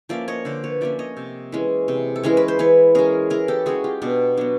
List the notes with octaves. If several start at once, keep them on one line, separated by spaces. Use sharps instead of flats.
F3 A#3 C#4 D5 E5
C#5 D#5
D3 C5 D5
B4 C#5
F3 A#3 C#4 D5 E5
C#5 D#5
C3
E3 G#3 C#4
C3
A4
E3 G#3 C#4 A#4
B4
C5
E3 B4 C#5
G#3 C#4 G#4 A#4
E3 G#4 A#4
G4 A4
G#3 C#4 F#4 G#4
F4 G4
B2 D4
F#3 B3 D4